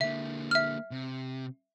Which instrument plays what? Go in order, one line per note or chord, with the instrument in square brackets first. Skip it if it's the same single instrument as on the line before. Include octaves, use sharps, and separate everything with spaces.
[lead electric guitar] D3 A#3 [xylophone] E5
[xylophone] E5 F6
[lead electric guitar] C3